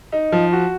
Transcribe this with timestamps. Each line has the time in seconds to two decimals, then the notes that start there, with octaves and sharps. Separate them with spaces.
0.12 D#4
0.32 F3
0.53 F#4